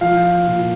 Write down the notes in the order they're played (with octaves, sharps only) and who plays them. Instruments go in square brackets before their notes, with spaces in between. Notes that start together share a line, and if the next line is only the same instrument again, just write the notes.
[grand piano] F3 F5
A#2